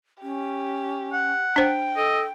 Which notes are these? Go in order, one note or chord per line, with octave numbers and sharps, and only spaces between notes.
C#4 G4
F#5
D4 C5 G5
A4 D#5